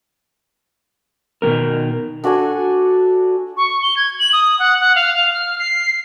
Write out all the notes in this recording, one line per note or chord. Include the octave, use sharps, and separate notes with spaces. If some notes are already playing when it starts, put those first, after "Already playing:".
B2 D#3 E3 B3 A#4
D4 F#4 A4 G#5
C#6
G7
G#6
F#7
D#6
F#5
F#5
F5
F5
F6
C7